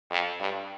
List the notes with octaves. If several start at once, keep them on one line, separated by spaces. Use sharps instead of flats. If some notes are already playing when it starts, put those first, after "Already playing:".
F2
G2